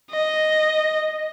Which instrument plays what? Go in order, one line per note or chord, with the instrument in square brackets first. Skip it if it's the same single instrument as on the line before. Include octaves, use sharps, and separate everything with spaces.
[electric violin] D#5